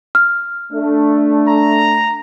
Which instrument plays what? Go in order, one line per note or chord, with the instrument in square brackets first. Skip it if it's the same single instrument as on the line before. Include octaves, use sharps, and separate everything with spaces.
[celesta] F6
[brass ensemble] A3 D4
[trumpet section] A#5